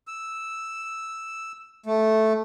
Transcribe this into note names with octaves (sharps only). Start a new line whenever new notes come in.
E6
A3